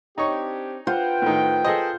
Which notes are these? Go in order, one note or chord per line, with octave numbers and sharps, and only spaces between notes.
C4 D4 D#4 G4 C#5 C#6
F4 B4 C5 F#5 G5
A2 D#3
G#4 A4 C5 D#5